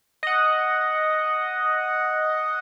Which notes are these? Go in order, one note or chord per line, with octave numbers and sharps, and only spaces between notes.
D#5 F#5